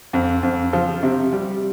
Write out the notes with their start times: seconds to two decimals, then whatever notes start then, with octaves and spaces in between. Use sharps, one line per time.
0.13 F2
0.43 F2
0.73 F3
1.03 C3
1.33 G3